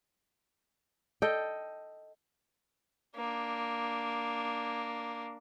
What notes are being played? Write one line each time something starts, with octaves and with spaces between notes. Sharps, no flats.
A4 D#5 G5
A#3 D4